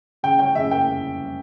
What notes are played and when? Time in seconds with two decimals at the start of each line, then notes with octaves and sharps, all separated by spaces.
0.23 C#3 G5
0.39 C#4 G5
0.55 C#3 E5
0.71 A#3 G5